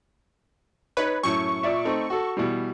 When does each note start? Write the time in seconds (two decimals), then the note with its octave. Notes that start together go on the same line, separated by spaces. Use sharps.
0.97 D#4 B4 C#5
1.23 F#2 A2 C#6
1.63 A#2 D5 E5
1.85 A3 C4 D#4
2.10 F#4 A4
2.37 B2 E3 G3